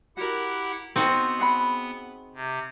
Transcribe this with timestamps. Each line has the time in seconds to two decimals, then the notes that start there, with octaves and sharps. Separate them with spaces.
0.17 E4 F#4 G4 A#4 F#5
0.96 B3 C4 D#4 F#4
1.39 G#4 F#5 B5
2.35 C3